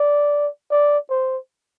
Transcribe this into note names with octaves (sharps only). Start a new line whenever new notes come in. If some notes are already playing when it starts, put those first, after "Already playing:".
Already playing: D5
D5
C5